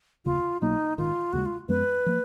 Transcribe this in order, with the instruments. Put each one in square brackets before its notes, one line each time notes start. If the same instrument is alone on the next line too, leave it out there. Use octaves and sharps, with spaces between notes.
[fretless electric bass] F1 D#2 C#3 [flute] F4
[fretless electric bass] B1 B2 F#3 A#3 [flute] D#4
[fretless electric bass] A#1 G#2 D#3 [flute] F4
[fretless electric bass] D#2 C#3 G#3 [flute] F#4
[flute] F4
[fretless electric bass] F#2 F3 G#3 B3 [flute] B4
[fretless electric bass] F3 A#3